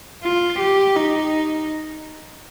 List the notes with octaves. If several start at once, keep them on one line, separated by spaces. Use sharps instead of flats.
F4
G4
D#4